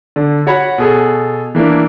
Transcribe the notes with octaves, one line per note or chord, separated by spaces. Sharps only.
D3
F#4 C#5 F#5 B5
B2 G#4 A4
E3 A#3 D4 E4